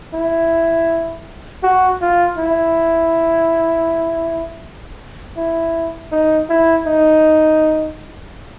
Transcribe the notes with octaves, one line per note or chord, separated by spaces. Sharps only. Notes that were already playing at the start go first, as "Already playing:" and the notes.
E4
F#4
F4
E4
E4
D#4
E4
D#4